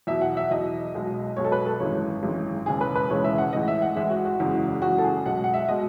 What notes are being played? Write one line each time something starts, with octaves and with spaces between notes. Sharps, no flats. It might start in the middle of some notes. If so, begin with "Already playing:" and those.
E2 B2 F#3 E5
F#5
E5
E2 B2 F#3 D#5
B1 B2 G#3
B1 B2 G#3 C#5
A4
B4
A4
G#1 F#2 E3 G#3 C#5
G#1 F#2 E3 G#3
E1 D#2 C#3 E3 G#3 G#4
B4
B4
E1 D#2 C#3 E3 G#3 C#5
E5
F#5
A1 A2 E3 G#3 D#5
E5
F#5
A1 A2 E3 G#3 E5
F#4
F#4
F#1 E2 C#3 G#3
F#1 E2 C#3 G#3 F#4
A4
G#4
B1 B2 G#3 F#5
F#5
E5
B2 G#3 D#5